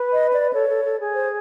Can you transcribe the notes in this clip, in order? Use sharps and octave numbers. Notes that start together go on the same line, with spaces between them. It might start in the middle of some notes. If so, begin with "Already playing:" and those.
Already playing: B4
D#5
D5
A4 C#5
A4
A4
G#4
C5